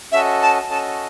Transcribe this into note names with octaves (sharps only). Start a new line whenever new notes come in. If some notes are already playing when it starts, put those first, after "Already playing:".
C#4 F#4 A4 D#5 E5
A5
C#4 F#4 A4 D#5 A5